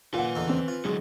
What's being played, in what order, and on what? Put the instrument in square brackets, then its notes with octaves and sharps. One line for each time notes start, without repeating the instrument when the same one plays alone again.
[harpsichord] A#2 [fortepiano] F4 F#5 [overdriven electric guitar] B4 G#5
[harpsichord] E2 D3 D#4
[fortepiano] C4
[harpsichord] F4
[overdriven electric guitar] D3 F#3 [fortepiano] G#3